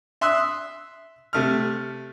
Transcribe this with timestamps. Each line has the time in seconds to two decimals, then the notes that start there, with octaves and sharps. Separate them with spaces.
0.21 E5 C6 D#6 E6 F#6
1.33 C3 A3 F6